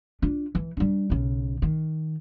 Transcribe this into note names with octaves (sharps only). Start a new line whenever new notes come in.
D4 F4
E3
G3 D4
B1 C#3
D#3